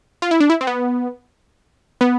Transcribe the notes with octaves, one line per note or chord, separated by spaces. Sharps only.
F4
E4
D4
E4
C4
B3
B3